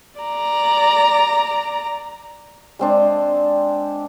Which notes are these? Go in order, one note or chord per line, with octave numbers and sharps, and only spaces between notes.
D5 A#5
G#3 C4 D4